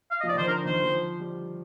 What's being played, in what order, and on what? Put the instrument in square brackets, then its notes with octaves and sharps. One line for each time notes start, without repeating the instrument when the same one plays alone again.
[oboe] F5
D#5
[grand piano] F3
[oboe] D5
[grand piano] D#3
[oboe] C5
[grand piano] D3 [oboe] A#4
[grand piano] D#3 [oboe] C5
[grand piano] F3
G3